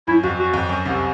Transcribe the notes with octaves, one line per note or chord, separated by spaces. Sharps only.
F#2 E4
F2 F#4
F#4
F2
F#2
C2 C3